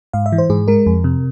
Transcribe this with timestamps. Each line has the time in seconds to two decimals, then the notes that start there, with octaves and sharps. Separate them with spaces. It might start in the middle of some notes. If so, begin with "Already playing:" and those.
0.13 G#2 F5
0.26 E5
0.32 E3
0.38 C5
0.50 G#2 G#4
0.68 G#3 A#4
0.87 F2
1.04 C3